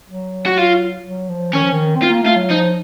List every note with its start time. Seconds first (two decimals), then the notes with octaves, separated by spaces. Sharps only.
0.09 F#3
0.46 F#4
0.57 F4
1.06 F#3
1.29 F3
1.53 D#3 C#4
1.63 F3
1.73 D#3
1.95 C4
2.02 F4
2.09 A#3
2.23 A3 F4
2.36 F#3
2.50 F3 D#4